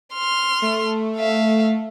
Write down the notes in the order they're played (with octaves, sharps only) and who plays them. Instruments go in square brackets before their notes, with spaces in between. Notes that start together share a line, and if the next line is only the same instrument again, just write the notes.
[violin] C6 F6
[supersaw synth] A3
[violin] E5 F5